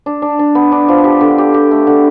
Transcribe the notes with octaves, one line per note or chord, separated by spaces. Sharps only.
D4
D4
D4
B3
D4
F3
G4
D3
G4
G4
A3
D3